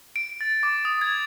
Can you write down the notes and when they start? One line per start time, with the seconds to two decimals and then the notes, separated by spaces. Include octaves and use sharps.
0.16 D7
0.41 A6
0.63 D6
0.85 D#6
1.01 G#6